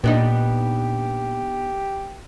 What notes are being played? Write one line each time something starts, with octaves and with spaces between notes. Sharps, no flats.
A#2 B3 D4 D#4 G4